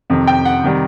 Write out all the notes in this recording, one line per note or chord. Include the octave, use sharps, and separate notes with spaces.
F2 C3 D#3
G5
F#5
C3 D#3 G3